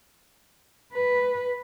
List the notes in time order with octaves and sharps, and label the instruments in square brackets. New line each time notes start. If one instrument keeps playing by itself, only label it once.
[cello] B4